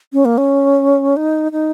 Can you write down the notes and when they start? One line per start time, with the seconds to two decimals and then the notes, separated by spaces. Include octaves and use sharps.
0.13 C#4
0.25 A#3
0.38 C#4
1.17 D#4
1.52 D#4